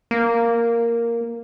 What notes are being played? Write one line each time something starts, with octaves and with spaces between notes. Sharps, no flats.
A#3